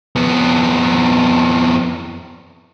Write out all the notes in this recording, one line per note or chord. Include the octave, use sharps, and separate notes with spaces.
F2 B3